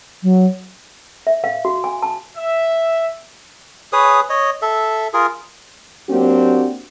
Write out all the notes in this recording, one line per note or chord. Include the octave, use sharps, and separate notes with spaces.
F#3
E5
F5
F#4
G#5
A5
E5
G#4 B4 C#5 D#6
C#5 D#5
A4 E5
F4 G#4 A#4
F#3 A#3 C4 D4 F#4 G4